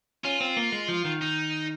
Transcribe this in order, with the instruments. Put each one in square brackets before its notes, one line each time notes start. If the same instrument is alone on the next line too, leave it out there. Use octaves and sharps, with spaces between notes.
[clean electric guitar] C#4 [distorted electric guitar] F4
[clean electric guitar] C4
A#3
G#3
F3
D#3
[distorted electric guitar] D#4